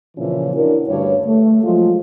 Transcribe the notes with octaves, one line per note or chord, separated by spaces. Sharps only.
A#2 C#3 E3 F3 C#4 E4
C#4 D4 E4 F#4 A#4
D2 G2 C#5
A3
F3 F#3 G#3 F4